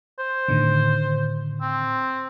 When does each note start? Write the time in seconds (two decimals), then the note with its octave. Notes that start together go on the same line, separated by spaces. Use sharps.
0.19 C5
0.48 A2 D3 D#3
1.61 C4